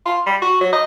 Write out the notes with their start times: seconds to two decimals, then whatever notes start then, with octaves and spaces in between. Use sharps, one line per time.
0.06 F4
0.26 G3
0.42 F#4
0.61 F#3
0.73 D#5